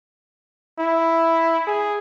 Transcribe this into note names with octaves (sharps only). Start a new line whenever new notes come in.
E4
G#4